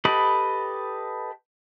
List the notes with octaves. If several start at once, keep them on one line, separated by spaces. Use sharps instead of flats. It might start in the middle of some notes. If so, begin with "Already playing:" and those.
G4 A4 B4 D#5 B5